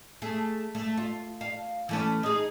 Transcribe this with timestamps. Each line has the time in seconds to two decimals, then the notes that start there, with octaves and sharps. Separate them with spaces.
0.22 A3 G#4
0.75 A3
0.97 F4
1.41 F5
1.89 E3 A3 C#4
2.23 D#4 G#4